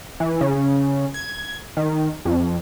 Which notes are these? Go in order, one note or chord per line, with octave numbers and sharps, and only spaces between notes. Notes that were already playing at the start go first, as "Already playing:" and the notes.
E3
C#3
G#6
D#3
F2